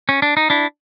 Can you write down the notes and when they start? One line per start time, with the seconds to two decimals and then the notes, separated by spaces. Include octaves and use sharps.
0.09 C#4
0.22 D4
0.37 D#4
0.50 D4 E4